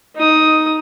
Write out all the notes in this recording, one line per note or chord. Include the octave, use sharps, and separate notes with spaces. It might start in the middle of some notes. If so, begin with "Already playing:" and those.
D#4 D#6